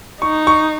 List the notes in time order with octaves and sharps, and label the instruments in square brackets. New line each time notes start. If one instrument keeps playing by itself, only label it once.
[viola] D#4 [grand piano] C#6
[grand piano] C#6